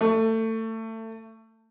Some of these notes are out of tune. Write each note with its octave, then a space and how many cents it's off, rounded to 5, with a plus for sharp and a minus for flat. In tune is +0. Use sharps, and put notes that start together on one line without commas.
A3 +25